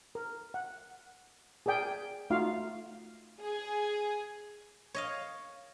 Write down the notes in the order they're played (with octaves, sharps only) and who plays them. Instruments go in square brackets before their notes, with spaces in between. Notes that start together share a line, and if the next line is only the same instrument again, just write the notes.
[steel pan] A#4
F#5
G#4 A#4 D5 G5
A3 D#4 F4 F#4 F5
[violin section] G#4
[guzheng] C#5 D#5 F5